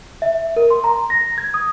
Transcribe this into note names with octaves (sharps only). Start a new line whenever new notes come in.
E5
A#4
C6
A#5
A#6
G#6
D#6